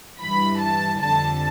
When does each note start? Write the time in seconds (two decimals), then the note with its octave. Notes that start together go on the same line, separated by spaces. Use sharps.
0.21 G2 E3 G3 B5
0.60 A5
1.01 F2 D3 G3 A5